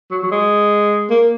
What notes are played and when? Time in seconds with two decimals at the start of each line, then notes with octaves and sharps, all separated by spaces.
0.11 F#3
0.23 F#3
0.31 G#3
1.10 A#3